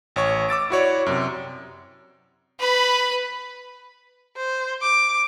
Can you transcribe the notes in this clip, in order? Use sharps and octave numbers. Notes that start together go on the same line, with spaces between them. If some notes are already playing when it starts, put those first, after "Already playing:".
A1 C#5 C#6
D6 E6 A6 D7
E4 F#4 C#5 D5
F#2 C3
B4 B5
C5
D6